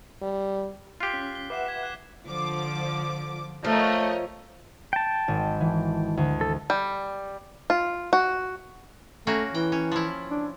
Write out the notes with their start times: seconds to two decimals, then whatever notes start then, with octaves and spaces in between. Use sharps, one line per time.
0.22 G3
1.00 F4 G4 F#6 C7 G7
1.14 C#4 B6
1.35 G7
1.50 B4 E5 F#5 D6 C7 E7
1.66 G#6 B6
1.83 F#6 E7
2.26 D3 F3 D6
3.64 F3 A3 A#4 C#5 D#5
4.93 G5 A5
5.28 G#1
5.61 E3
6.17 D2
6.41 A4
6.70 G3
7.70 F4
8.13 F#4
9.27 A3 A#3 C#4 F#4
9.55 E3 G5
9.72 C#4
9.92 F3 E4
10.31 D4